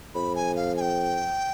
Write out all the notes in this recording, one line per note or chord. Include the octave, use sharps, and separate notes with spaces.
F2 B5
G#5
F5
G#5
G5